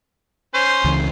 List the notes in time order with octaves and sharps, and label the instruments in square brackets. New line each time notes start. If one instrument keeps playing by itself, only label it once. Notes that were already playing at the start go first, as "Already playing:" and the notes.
[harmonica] C#4 C5
[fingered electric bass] C#2 C#3 E3